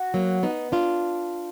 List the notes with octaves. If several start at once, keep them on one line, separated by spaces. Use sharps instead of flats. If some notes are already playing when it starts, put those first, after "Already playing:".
Already playing: F#4
F#3 A#3
B3 D#4
D4 F4